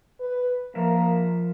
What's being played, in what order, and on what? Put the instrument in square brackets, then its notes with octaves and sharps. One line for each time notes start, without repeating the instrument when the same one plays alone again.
[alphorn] B4
[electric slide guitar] F3 A#4 E5 [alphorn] A#3